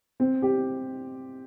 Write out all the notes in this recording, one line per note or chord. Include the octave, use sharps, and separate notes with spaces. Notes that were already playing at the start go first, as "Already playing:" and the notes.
C4
G4